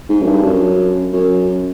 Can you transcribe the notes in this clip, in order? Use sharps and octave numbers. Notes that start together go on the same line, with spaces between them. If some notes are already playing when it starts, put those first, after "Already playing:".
G#2
F#2
G2
F#2
F#2